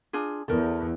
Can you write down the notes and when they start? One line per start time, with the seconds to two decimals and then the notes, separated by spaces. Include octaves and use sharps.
0.13 D4 F4 G#4
0.48 E2 A4 A#4